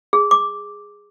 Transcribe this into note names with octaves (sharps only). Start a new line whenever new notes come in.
G#4
D6